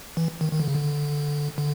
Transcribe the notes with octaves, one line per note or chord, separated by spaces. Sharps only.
E3
D#3
D#3
D3
C#3
D3
D3